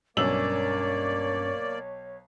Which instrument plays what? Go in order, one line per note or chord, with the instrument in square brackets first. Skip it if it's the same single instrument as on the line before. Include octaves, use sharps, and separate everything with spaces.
[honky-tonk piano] B1 E6 F#7 [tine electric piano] G2 C#4 [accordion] A#3 D5 [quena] C#5